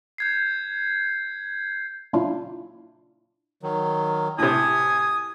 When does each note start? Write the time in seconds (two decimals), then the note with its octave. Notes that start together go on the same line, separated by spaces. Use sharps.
0.18 G6 G#6 C7
2.13 A#2 C#3 F#3 D4 E4 F4
3.62 D#3 F#3
4.38 A2 C3 G#5 D#6